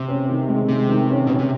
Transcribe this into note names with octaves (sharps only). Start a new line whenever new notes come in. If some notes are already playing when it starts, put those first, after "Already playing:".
Already playing: C3
C#4
D#3
G#3
C3 G#3
D#3
C#4
B2 C#4
C3